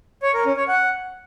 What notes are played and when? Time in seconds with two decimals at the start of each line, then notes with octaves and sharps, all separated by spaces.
0.22 C#5
0.34 A#4
0.45 C#4
0.57 C#5
0.68 F#5